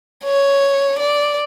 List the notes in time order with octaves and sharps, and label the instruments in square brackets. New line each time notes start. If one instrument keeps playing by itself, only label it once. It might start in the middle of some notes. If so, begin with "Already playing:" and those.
[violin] C#5
D5